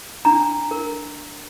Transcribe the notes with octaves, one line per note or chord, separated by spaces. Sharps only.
D4 A#5
A#4